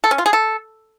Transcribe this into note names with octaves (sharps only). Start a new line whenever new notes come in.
A4
C#4
F4
G#4
A4